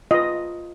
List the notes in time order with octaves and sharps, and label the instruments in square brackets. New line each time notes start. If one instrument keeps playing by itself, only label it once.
[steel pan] F4 B4 D#5